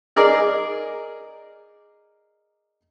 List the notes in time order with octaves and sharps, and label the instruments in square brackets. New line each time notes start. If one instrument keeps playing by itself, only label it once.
[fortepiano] D#4 G#4 A#4 D5